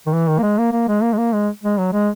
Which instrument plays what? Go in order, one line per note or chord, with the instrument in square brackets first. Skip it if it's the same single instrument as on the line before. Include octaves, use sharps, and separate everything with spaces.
[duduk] D#3
E3
D#3
A#3
G#3
A#3
A#3
G#3
A#3
G#3
A#3
G#3
G#3
F#3
G#3